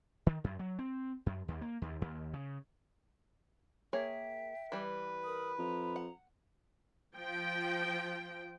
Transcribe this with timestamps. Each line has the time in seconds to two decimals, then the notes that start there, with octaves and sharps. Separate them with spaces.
0.27 D#3
0.44 F#2
0.59 F#3
0.79 C4
1.26 F#2
1.48 D#2
1.61 A#3
1.82 D#2
2.02 D#2
2.34 C#3
3.93 A#3 G#4 C#5 E5 G5
4.72 E3 G3 B4
5.25 A#4 B5 D#6
5.58 F2 A#5
5.96 F#5
7.16 F3 G5